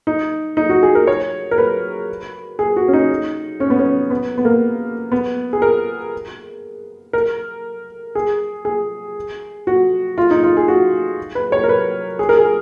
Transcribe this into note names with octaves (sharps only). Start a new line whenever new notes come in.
D#4
D#4
F#4
G#4
A#4
C#5
A#4
B4
G#4
F#4
C#4
D#4
C#4
B3
C#4
B3
B3
A#3
B3
G#4
A#4
A#4
G#4
G#4
F#4
F4
D#4
F4
G#4
F#4
B4
C#5
A#4
B4
G#4
A#4
G#4